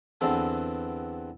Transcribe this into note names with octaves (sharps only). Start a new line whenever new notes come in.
E2 D3 E3 C4 A4 G5